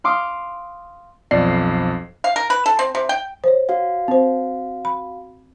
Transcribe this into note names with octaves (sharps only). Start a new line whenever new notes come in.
F5 C6 D6 D#6 F6
B1 F2 D5 C7
F5
A#4
B4
A4
C4
C3
G5
C5 C#5
F#4 F5
C4 C5
B5